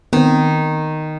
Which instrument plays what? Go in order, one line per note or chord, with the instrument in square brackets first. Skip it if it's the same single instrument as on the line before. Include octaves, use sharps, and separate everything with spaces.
[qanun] D#3 [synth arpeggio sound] B3 C4